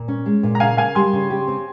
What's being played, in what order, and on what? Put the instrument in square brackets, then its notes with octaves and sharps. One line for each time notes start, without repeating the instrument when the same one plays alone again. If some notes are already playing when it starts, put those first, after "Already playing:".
Already playing: [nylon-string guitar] A#2
C#4
G#3
A#2
[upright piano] A#5
[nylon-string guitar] C#3 [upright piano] F5 G#5
[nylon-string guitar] A#3 [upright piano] F5 G#5
[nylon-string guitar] G3 [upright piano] G#5 C6
[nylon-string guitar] C#3
G4
C4